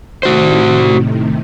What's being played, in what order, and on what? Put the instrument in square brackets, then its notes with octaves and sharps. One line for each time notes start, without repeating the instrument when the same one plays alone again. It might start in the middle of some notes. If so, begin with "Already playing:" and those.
[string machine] A2 C3 D#3 [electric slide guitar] F#4 C5